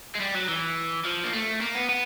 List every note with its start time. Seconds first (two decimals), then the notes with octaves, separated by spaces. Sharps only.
0.15 G#3
0.21 G3
0.35 F#3
0.49 E3
1.05 F3
1.24 A#3
1.33 A3
1.61 A#3
1.75 B3
1.89 B3